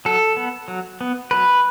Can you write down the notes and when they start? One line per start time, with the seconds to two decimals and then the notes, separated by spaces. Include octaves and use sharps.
0.05 F#3 A4
0.37 B3
0.68 F#3
1.01 B3
1.31 F#3 B4